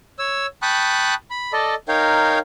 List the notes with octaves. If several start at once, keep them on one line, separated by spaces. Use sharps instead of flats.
C#5 E6
G5 A5 B5 C#6 D#6 F#6
B5
A4 D5 D#5
D#4 A#4 C#5 F5 G5